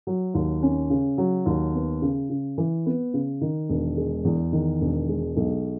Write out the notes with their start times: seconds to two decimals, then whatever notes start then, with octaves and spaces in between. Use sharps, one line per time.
0.07 F#3
0.34 D#2
0.63 C#4
0.90 C#3
1.18 F#3
1.46 D#2
1.74 B3
2.02 C#3
2.30 C#3
2.58 E3
2.86 B3
3.14 C#3
3.41 D#3
3.69 E1
3.97 G#3
4.25 E2
4.53 D#3
4.81 E1
5.09 G#3
5.37 B1